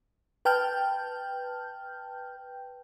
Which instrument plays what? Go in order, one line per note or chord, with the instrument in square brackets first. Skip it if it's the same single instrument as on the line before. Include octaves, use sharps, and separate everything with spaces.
[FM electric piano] B4 G5 A5 F6 G6